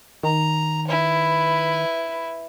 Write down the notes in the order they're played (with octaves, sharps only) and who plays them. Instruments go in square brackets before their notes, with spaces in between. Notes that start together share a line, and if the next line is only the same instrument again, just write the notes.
[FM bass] D#3 [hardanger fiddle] A#5
[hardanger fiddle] E4 B4